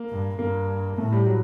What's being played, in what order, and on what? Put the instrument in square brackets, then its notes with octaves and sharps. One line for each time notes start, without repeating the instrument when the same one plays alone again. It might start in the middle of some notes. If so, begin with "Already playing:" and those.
Already playing: [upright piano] A#3
[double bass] G2
[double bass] G2 [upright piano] A#3
[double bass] A2 [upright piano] A3
[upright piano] G3
F#3